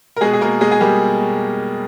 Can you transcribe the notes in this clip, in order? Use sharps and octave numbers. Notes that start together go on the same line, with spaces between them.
A#4
B2 G#3 G#4
G#4
B2 A#3 A#4
B2 G#3 G#4
G#4
G3 A#3 G4
B2
B2